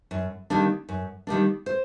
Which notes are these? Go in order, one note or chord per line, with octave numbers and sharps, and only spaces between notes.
F#2
D#3 G3 A#3 D4
F#2
D#3 G3 A#3 D4
C5